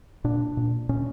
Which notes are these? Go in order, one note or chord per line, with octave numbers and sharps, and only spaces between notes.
A#2 D4
A#2
A#2 C#4